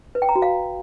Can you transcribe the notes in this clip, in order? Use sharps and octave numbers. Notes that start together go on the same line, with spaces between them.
B4
G5
A#5
F#4
F5